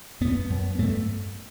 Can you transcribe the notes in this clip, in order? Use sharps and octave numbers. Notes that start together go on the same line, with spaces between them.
F#2 B3
F#2
G2 A3